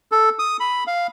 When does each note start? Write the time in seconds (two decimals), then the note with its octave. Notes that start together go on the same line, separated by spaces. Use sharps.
0.12 A4
0.39 D#6
0.60 B5
0.87 F5